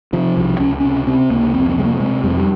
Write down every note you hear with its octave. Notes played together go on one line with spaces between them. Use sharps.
C3 F3
C2 F3
C#2 C#4
C3 C#4
C3 C4
C#2 A#3
F2 C4
C4
C3 G#3
A#3
G3
C3 G#3
F2 G3
G#3
G3